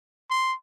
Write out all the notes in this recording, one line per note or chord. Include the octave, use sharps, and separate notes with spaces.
C6